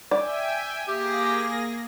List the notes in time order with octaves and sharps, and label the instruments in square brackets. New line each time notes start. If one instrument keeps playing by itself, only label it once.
[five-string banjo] D5 [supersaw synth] E5 G5 G#5
[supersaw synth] A#3 G#4 A#6 [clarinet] G4